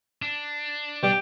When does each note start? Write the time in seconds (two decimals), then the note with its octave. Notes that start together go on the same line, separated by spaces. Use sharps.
0.22 D4
1.03 B2 G3 G4 D6